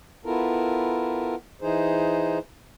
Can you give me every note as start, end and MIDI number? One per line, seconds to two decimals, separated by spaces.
0.25 1.35 59
0.25 1.35 64
0.25 1.35 65
0.25 1.35 69
0.25 1.35 70
1.61 2.38 52
1.61 2.38 63
1.61 2.38 68
1.61 2.38 72